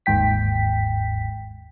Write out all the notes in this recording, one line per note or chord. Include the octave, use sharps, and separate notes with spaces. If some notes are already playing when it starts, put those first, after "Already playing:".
G1 D#2 G#2 G5 B6